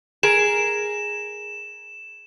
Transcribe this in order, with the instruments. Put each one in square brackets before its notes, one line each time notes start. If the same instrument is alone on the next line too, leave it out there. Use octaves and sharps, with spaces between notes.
[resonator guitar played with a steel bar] G#4 A#4 [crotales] E7